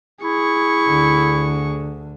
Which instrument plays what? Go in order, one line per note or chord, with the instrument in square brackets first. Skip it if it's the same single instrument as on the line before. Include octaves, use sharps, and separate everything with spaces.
[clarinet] E4 [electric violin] G#4 C#6
[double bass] D2 D3